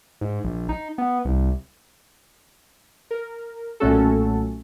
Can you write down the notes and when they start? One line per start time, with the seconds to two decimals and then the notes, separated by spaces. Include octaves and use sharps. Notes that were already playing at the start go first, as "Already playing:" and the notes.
0.21 G#2
0.44 A#1
0.69 D#4
0.98 B3
1.25 C2
3.11 A#4
3.80 B1 A#2 A3 C#4 F#4 A4